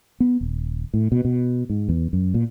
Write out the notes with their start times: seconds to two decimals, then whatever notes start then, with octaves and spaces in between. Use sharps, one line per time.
0.20 B3
0.41 D#1
0.94 A2
1.12 B2
1.25 B2
1.70 G#2
1.89 E2
2.13 F#2
2.34 A#2